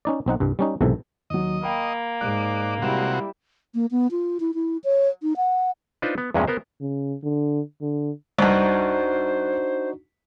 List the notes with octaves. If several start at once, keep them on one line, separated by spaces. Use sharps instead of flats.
C#4 D#4 D5
B1 C4 D#4 F#5
C2 G2
G3 C#4 D#4
B1 G#2 C3 E3 A4
D#2 F#3 D#5
A#3 G5 B5
G#2 D5 F#6
C3 G3 G#3 E4 F#4 E7
A#3
B3
F4
E4
E4
C#5
D#4
F#5
D4 D#4 F4 B4 C5
B3
E2 G2 A#2 G#3 C#4
B3 A#4 C5
C#3
D3
D3
C2 G2 D4 D#4 F#4 C5